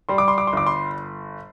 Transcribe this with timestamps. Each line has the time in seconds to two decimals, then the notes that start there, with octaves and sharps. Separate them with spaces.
0.09 G3 C6
0.18 D6
0.28 C6
0.38 D6
0.47 C6
0.53 G1 D6
0.67 C6